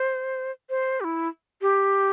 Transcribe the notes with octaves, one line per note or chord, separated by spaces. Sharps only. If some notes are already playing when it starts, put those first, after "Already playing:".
Already playing: C5
C5
G4
E4
G4